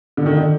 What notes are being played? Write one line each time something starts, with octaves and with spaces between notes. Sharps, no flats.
D3
D#3
D3